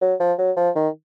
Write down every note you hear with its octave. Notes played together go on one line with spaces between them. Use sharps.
F#3
F3
F#3
F3
D#3